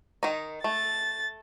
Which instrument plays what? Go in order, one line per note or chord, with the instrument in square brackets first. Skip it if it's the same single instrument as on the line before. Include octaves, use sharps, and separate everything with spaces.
[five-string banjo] D#3 D#4
[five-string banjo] A3 [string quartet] A6